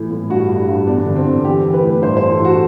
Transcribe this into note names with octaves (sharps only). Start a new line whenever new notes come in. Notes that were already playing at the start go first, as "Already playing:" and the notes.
Already playing: A2 E3
A2
G2 F#4
G2
G2
E2 D4
D3
C4
E2
E3 G4
E3
B4
A2
G2 C5
E3 C5
A4
E3 F#4